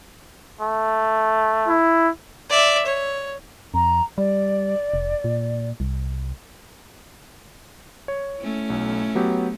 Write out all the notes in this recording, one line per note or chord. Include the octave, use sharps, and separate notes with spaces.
A3
E4
D5 E5
C#5
F2 A#5
G3 D5
F1
A#2
C2
C#5
A3 C#4 E4
B1
F#3 B3 G4